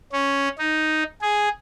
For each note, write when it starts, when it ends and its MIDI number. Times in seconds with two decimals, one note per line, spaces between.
0.12 0.48 61
0.59 1.04 63
1.22 1.49 68